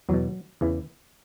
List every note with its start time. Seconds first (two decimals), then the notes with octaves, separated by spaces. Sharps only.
0.09 E2 B2 F#3
0.61 E2 C#3 E3